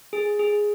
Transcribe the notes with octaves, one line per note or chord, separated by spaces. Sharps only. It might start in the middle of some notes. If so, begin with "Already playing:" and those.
G#4
G#4